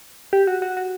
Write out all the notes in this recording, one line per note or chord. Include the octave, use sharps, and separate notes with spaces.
G4
F#4
F#4
F#4